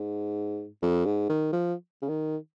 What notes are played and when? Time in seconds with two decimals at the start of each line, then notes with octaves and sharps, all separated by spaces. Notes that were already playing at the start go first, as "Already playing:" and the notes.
Already playing: G#2
0.82 F2
1.05 G#2
1.29 D#3
1.53 F3
2.02 C#3
2.08 D#3